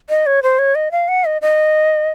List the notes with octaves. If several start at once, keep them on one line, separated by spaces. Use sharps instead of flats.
D#5
C#5
C5
C#5
D#5
F5
F#5
D#5
D#5